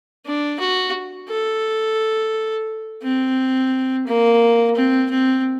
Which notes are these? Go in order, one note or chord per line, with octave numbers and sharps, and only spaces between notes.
D4
F#4
A4
C4
A#3
C4
C4